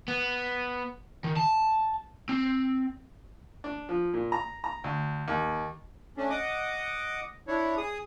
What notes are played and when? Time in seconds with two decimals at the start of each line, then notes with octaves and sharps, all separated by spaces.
0.08 B3
1.24 D#3
1.37 A5
2.29 C4
3.64 D4
3.89 F3
4.14 A#2
4.32 A#5
4.64 A#5
4.84 D2
5.28 D#2
6.17 A3 C#4 D4
6.30 D#5 F#5 D6 D#6
7.48 D4 E4 C#5
7.77 G#4 D#6